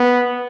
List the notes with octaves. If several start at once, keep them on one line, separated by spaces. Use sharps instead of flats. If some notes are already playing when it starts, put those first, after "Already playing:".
Already playing: B3